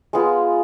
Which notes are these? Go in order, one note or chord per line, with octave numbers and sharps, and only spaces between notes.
G#3 B3 F4 G#4